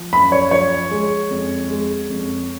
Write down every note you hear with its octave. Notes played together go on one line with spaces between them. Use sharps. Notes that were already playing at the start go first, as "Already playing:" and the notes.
Already playing: F3
F#2 B5
C#5
F3 C#5
G#3
F2
G#3
F2